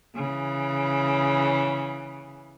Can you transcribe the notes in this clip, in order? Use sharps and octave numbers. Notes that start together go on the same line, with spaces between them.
C#3 E3